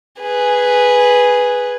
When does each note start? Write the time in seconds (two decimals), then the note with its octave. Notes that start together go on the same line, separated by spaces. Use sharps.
0.21 G#4 B4